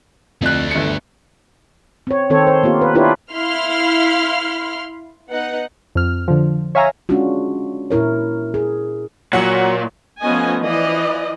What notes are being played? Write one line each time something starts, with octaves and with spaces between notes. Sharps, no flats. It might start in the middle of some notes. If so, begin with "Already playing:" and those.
F2 A3 D4 F#6
G1 C#7
C4 C#5
D#3 C4 A4 C#5
C5
A#3 B3 F4 G4
B4
D4 E4 F4 G4 B4 C#5
E4 F5 B5 C6 F6
B3 D#4 F#5
F2 F6
D3 F3
C#5 E5 F5 G#5 A#5
G#3 C#4 D4 F4 F#4
A#2 E4 A#4 C#5
G#4
A#2 F#3 F#4 C#5 F#5
F3 A3 B3 C#4 D#5 G#5
E3 F3 D5 D#5